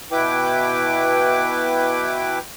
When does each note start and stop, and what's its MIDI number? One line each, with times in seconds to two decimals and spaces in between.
0.12 2.39 47
0.12 2.39 64
0.12 2.39 71
0.12 2.39 79
0.12 2.39 86